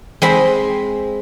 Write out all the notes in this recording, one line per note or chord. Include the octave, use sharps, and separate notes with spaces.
G#3 C4 B5